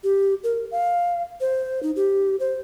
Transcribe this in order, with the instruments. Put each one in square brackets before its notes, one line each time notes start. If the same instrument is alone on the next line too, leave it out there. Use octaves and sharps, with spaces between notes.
[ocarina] G4
A#4
F5
C5
D#4
G4
C5